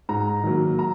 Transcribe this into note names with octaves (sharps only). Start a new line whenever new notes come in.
G#2 A#5
D#3 F#3 A#3
A#5